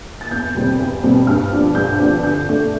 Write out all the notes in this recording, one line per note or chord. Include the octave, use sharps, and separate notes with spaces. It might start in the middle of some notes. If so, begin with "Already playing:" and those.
A6
E2 G6
B2 G3 C4
E2
B2 G3 C4
G2 F6
F3 B3 D4
G2 G6
F3 B3 D4
D3 G6
A3 D4